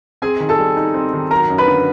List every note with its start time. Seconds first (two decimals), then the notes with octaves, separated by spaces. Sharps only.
0.22 C4 G#4 G#5
0.40 D#3
0.49 A4 A5
0.58 G3
0.77 D#4
0.94 C4
1.13 D#3
1.31 F#3 A#4 A#5
1.50 F#2
1.58 B4 B5
1.68 D3